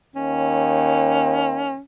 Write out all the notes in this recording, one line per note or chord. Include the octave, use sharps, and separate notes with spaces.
D#2 C#4